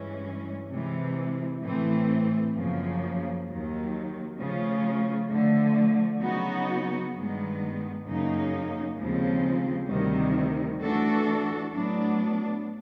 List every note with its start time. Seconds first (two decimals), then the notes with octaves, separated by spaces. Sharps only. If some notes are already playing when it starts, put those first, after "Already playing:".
Already playing: G2 E3 G#3 C#4
0.70 C3 E3 G#3
1.62 A2 E3 A3 C4
2.55 F#2 C#3 F3 A#3
3.47 D#2 D#3 F#3
4.38 C#3 F3 A3 C#4 F4
5.30 D3 F3 A3
6.21 C#3 F#3 B3 D#4 F#4
7.13 G2 D#3 G#3 B3
8.06 F#2 C#3 F#3 A#3 D#4
8.97 D#2 C#3 F3 G#3 C4
9.89 D2 C3 D#3 G3
10.81 E3 A3 D4 F#4 A4
11.73 A2 F#3 B3 D4